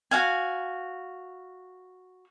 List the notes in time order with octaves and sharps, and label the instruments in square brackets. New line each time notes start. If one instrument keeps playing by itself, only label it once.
[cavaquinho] F#4 F5 G#5